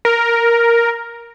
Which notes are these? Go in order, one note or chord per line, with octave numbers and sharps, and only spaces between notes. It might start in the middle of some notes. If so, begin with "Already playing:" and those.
A#4